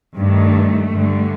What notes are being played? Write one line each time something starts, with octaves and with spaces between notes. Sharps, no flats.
G2 D#3 A3
G2 D3